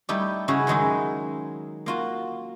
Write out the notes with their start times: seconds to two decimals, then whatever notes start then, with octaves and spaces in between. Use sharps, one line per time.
0.09 G3 A3 D#4 E4 G4
0.48 C#3 C#4 E4 F#4 C#5
0.67 D#3 F#3 G#3 D#4 E4
1.86 A#3 F4 F#4